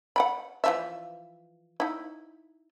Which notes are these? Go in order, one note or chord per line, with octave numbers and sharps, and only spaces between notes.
F#5 G5 B5
E3 F3 E5
D#4 E4